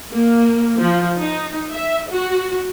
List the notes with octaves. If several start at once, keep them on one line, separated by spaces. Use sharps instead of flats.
A#3
F3
D#4
E5
F#4